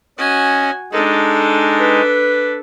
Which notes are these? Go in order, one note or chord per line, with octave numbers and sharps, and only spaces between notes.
C#4 F#4 D#5 G#5
G#3 D4 D#4 A4
B4